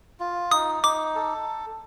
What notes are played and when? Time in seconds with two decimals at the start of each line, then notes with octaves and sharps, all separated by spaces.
0.20 F4
0.51 D#4 D#6
0.83 D#4 D6
1.15 A4